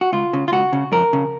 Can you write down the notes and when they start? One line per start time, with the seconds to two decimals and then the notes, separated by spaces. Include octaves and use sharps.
0.01 F#4
0.13 C#2 F4
0.33 C#3
0.48 F4
0.52 C#2 F#4
0.73 C#3
0.92 F2 A#4
1.13 C#3